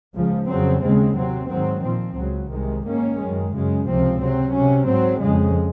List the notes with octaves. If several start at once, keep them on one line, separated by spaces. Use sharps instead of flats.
C#2 C#3 F3
F2 C#3 F#3 C4
D#2 C#3 G#3 C4
C3 F#3 C4
G#2 D#3 F#3 C4
A#2 F3 C4
C#2 C#3 F#3
C2 C3 D#3 G#3
G#2 D#3 A#3 C#4
F#2 D#3 G#3
F#2 C#3 G#3
C#2 C3 F3 C4
C3 F#3 C4
C3 F#3 C#4
G#2 F#3 C4
F2 C#3 G#3